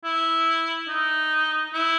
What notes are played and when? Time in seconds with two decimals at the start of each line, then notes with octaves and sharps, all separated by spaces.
0.04 E4
0.89 D#4
1.73 E4